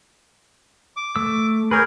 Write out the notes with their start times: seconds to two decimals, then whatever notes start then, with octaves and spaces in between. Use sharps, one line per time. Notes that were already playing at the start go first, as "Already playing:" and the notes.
0.96 D6
1.16 A3 E6
1.71 G#4 A#4 B4 C#5 G6